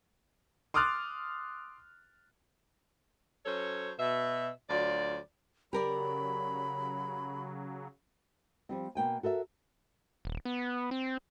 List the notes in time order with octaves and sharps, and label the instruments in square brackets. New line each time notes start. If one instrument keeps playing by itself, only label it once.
[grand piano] C6 D6 D#6 F6 F#6 A6
[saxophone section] F#3 C#4 A4 C5 C#5
B2 E5
D2 F#3 F4 D5
[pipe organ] C#3 F#3 [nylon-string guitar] G4 A#4 D5 [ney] B5
[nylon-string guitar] F3 G3 C4
B2 A#3 G5 G#5
F#4 A4 A#4 E5
[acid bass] D#1
B3
C4